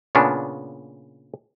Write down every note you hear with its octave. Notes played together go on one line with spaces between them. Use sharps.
A#2 C#3 B3 C#4 D4